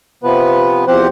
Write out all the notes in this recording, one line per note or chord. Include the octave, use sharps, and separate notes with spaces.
C3 F3 B3 B4
E2 F3 C4 G4 C5 F#5